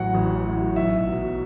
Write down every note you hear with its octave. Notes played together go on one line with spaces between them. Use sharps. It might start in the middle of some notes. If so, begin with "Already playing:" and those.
Already playing: A1 A2 F#3 F#5
A1
A2 F#3
B1 E5
B2 F#3